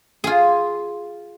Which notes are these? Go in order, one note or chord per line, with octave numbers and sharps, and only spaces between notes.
F4 G#4